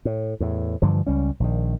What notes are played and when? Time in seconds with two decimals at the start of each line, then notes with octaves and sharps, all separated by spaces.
0.05 A2
0.40 E2 A2
0.82 G2 D3 E3 F3
1.07 C#2 G3 C#4
1.40 A#1 D#3